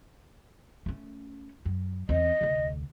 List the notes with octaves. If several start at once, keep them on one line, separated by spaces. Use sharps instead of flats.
A3 C#4
F#2
E2 C4 D#5
F1 D2